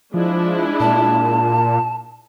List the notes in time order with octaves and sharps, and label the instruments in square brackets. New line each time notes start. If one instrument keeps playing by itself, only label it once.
[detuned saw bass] F3 [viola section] G#3 D4 E4
[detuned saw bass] A#2 [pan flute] A5